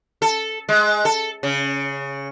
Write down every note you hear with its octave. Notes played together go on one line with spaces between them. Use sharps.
A4
G#3
A4
C#3